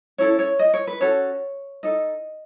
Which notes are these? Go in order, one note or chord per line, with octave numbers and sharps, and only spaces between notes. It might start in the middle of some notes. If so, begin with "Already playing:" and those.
C#4 E4 A4 C#5
C#5
D#5
C#5
B4
C#4 F#4 A4 C#5
D#4 A4 D#5